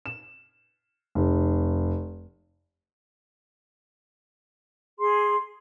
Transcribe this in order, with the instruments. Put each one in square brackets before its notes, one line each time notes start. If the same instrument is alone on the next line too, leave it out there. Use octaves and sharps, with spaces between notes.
[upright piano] E7
F1
[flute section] G#4 C6